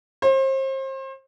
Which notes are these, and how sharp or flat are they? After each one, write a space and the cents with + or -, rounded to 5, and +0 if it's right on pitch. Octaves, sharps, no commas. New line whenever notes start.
C5 +35